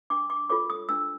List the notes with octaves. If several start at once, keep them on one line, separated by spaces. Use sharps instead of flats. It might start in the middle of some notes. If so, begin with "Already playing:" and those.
D4 D6
D6
F4 A4 C#5 D6
D#6
D4 E6